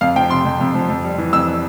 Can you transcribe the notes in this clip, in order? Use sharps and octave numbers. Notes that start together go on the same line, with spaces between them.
F2 F5
F3 G5
C3 C6
F2
F2
F3
F2
G3
E3
F2 E6